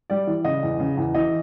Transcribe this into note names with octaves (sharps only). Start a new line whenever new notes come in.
G3 D5
E3
C#3 D#5
E2
C#3
E2
E3 D#5